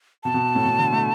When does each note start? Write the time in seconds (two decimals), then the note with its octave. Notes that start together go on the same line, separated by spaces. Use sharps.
0.24 B2 A5
0.34 B2
0.55 A2
0.65 B2
0.79 D3
0.92 A3